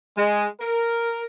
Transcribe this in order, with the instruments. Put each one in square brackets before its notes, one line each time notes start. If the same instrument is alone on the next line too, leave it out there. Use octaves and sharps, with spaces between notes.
[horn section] G#3
A#4